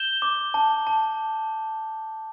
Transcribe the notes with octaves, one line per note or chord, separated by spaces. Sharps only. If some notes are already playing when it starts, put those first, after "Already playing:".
Already playing: G6 E7 G7
D6
A5
A5